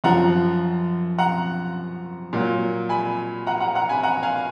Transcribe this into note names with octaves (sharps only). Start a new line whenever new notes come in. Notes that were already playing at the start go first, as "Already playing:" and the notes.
F#2 F3 F#5 A#5
F#5 A#5
A#2 F#3
G#5 B5
F#5 A#5
F#5 A#5
F#5 A#5
G#5 B5
F#5 A#5
F5 G#5